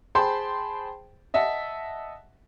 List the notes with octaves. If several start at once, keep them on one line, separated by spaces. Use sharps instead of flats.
G#4 C5 G5 A5 B5 C6
D#5 E5 F#5 A5